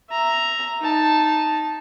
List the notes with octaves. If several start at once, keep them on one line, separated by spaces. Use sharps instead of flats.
E5 A#5
D#4 A5